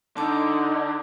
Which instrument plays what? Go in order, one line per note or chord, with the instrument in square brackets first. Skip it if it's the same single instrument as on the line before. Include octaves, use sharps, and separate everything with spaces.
[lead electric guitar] D3 [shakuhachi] D#4 [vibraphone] A5 D6